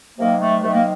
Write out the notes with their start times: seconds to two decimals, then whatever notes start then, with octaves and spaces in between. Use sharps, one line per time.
0.17 C3 D#3 F#3 A#3
0.39 A3
0.62 C3 D#3 F#3 A3
0.71 A#3